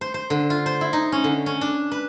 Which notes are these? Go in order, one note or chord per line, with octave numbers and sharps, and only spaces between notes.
C5
C5
D3
F4
C5
E4
D#4
C#4
D3
C#4
D4
B4